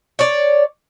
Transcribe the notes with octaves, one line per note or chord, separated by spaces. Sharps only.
C#5 D5